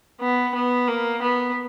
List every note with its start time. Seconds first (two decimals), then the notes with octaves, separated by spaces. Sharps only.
0.20 B3
0.54 B3
0.88 A#3
1.22 B3